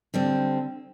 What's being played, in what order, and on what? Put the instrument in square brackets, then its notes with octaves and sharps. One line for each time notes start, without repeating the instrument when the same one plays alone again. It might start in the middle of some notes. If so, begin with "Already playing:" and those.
[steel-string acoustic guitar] D3 G3 C4